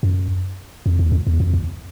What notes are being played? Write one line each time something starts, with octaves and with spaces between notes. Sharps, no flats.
F#2
F2
E2
F2
E2
F2
E2